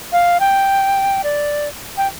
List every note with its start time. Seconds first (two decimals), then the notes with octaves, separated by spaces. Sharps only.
0.12 F5
0.40 G5
1.24 D5
1.97 G5